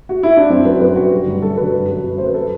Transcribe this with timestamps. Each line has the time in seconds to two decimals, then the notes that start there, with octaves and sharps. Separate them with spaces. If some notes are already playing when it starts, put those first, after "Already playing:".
0.09 F#4
0.23 E4
0.37 D4
0.50 F#2 C4
0.65 F#3 B4
0.81 F#2 B4
0.96 F#3 F#4
1.11 G2
1.26 D3 F#3
1.42 G2 A4
1.57 D3 F#3 B4
1.73 F#2
1.88 F#3
2.04 F#2
2.18 F#3 C5
2.26 B4
2.34 A4